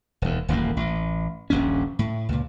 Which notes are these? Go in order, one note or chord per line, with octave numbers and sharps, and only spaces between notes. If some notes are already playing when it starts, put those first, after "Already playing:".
E1 D#2
D#1 A1 F#2 A#3
A1
D#1 A#1 G2 C#4
A2
C#2 A#2